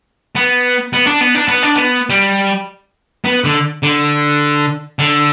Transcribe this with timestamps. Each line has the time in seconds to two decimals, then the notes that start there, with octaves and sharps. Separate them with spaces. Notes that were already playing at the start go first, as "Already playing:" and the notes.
0.35 B3
0.93 B3
1.07 D4
1.21 B3
1.35 D4
1.48 B3
1.62 D4
1.75 B3
2.10 G3
3.25 B3
3.44 D3
3.83 D3
4.99 D3